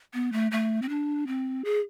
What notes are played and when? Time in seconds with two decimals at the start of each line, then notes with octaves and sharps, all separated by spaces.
0.14 B3
0.32 A3
0.52 A3
0.82 C4
0.89 D4
1.27 C4
1.65 G#4